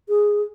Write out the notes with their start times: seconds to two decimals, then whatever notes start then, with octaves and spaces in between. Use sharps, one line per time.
0.09 G#4